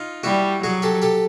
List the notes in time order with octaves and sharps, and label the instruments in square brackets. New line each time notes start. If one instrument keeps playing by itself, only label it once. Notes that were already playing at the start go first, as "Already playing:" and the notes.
Already playing: [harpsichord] D#4 F4
[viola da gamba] G3 [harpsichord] E4 F#4
[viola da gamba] F#3 [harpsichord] F#4 G#4
[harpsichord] G4 A4
G4 A4